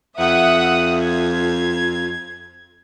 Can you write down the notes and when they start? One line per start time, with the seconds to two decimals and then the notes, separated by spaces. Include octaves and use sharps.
0.19 F2 E5 F#5 D#6
1.02 G#6